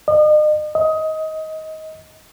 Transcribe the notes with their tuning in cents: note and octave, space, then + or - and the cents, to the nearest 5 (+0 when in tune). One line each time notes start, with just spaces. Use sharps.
D#5 -40
D#5 +20